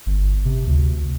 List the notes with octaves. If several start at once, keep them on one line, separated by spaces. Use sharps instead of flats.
G1
C3
D2